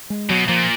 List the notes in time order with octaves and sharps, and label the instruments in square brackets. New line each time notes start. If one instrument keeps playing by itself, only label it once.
[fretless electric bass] G#3
[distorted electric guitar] B2 [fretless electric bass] F#3
[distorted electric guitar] A#2 [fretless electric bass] F3